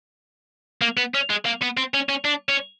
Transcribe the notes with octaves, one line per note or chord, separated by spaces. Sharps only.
A#3
B3
C#4
G#3
A#3
B3
C4
C#4
C#4
D4
C#4